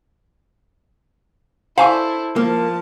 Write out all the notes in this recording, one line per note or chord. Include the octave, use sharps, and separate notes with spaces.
E4 A4 C5 F5 G#5 C#6
F3 A#3 A5